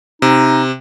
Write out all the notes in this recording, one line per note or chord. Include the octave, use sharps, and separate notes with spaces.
C3 D#4